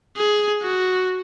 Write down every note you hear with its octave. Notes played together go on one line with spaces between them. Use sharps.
G#4
F#4